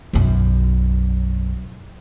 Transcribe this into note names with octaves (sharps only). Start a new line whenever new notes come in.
B1 F#2